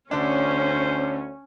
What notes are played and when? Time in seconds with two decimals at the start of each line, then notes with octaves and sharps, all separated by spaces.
0.11 D2 D3 C#4 D4 C5